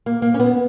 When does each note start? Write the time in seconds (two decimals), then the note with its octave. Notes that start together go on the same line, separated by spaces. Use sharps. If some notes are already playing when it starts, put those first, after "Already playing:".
0.06 A#3
0.22 A#3
0.34 C#4
0.40 B3